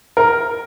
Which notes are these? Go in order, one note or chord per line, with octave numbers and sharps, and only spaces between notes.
A#4